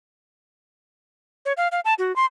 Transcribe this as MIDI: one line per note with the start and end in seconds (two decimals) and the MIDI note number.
1.45 1.53 73
1.57 1.68 77
1.72 1.80 77
1.85 1.94 81
1.98 2.15 66
2.16 2.26 84